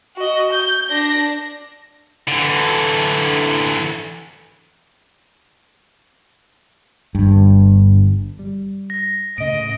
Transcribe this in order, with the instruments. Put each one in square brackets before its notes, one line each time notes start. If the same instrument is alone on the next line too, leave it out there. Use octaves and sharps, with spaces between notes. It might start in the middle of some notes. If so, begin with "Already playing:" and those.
[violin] F#4 D#5
G6
D4 A#6
[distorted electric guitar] D3 E3
[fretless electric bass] G1 G2
[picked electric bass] G3
[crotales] A#6
[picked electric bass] A2 C#3 [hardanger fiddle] D#5 [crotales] D7